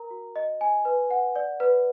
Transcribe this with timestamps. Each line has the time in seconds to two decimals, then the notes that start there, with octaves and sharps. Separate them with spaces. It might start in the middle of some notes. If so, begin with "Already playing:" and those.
Already playing: A#4 A#5
0.11 F#4
0.36 D#5
0.61 G#5
0.85 B4
1.10 F#5
1.36 D5
1.60 B4